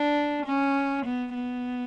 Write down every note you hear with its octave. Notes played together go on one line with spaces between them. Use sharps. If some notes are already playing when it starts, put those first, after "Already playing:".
Already playing: D4
C#4
B3
B3